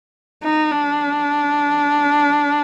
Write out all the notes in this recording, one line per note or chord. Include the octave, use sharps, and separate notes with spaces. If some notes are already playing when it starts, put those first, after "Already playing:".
D#4
D4